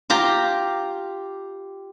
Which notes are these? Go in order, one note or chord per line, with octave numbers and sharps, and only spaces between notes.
F4 G4 A#5